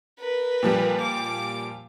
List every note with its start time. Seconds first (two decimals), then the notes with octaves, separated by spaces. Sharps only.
0.19 A#4 B4
0.63 A#2 F3 G3
1.01 D6 D7